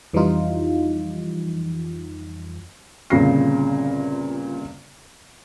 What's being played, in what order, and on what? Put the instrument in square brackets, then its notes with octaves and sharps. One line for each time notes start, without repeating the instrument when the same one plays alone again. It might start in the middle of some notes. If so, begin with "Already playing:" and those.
[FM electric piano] F2 E3 F3 G3 D#4 F4
[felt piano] G1 A#2 C#3 C4 A#6 C7